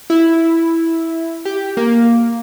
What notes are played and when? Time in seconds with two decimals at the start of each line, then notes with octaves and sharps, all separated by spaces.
0.10 E4
1.45 G4
1.77 A#3